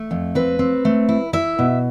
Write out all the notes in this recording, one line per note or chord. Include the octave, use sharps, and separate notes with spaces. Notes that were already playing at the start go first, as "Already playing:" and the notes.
Already playing: A3
F2
C4 B4
C4
A3
E4
E4 E5
B2